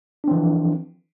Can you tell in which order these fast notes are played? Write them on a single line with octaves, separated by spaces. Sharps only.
D4 C4 E3 F3